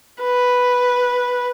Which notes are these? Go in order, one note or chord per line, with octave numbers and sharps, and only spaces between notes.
B4